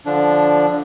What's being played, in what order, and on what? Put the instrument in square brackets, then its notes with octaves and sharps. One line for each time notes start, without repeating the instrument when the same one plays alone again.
[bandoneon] D3 F3 D4